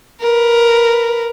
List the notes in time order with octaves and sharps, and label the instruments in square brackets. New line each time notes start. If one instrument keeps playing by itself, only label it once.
[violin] A#4 B4